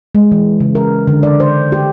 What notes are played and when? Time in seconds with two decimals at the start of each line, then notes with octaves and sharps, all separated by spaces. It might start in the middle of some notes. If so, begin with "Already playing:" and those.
0.15 G#3
0.32 E3
0.60 C#3
0.75 A#4
1.07 D3
1.23 D5
1.40 C5
1.72 G4